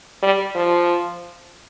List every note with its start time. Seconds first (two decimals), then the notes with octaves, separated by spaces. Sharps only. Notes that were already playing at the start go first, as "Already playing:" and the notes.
0.22 G3
0.55 F3